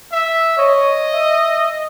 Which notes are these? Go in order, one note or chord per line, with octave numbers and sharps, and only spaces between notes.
E5
C#5 D#5
E5